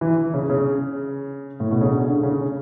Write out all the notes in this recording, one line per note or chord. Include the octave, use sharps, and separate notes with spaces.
E3
C#3
C#3
A2
B2
C#3
D3
C#3